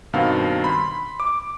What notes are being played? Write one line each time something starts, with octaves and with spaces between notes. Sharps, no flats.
G2 B2 D#3 C4 F5
B5 C6
D6